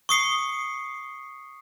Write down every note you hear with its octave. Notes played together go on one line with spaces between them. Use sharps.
C#6 D#6 C7 C#7